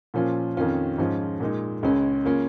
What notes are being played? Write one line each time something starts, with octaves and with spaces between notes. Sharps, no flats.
A#2 F3 A#3 C#4 F4
F2 D#3 C#4 F4
G#2 F3 C#4 F4
A#2 G#3 D#4
C#2 C#3 G#3 C#4
C#3 A#3 C#4 F4